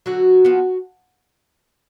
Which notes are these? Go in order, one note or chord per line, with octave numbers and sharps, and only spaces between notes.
D3 F#3 F#4
F3 B3